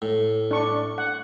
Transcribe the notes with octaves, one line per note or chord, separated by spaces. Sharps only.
A2
D4 C#6
F#5